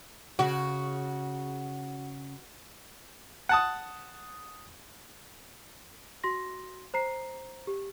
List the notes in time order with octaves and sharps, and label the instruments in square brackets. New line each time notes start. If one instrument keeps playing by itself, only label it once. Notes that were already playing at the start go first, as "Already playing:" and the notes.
[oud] C#3 [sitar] F#4
[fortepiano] F#5 A5 D#6
[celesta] F#4 C6 A#6
C5 A#5 C7
G4